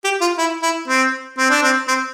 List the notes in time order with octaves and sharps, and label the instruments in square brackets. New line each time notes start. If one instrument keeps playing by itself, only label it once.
[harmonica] G4
F4
E4
E4
C4
C4
D4
C4
C4